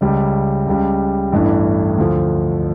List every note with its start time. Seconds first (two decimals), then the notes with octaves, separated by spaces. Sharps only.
0.01 C#2 C#3 G3
0.67 C#2 C#3 G3
1.32 A1 G2 E3 A3 D4
1.98 D2 D3 F3